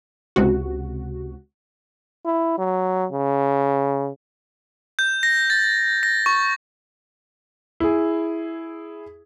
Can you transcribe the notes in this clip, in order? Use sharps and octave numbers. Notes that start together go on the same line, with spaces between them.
C#2 C3 F#4
E4
F#3
C#3
G6
A#6
A6
A#6
C#6
E4 G#4